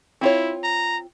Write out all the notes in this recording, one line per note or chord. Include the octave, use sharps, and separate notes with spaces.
C4 E4 F4 C#5
A#5